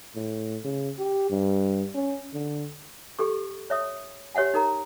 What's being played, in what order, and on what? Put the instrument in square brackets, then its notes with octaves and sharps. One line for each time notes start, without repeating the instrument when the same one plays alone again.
[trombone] A2
C#3
G4
G2
C#4
D3
[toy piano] G4 A4 C#6
C#5 E5 D#6
G4 C#5 E5 F#5 G#5
D#4 A#4 A#5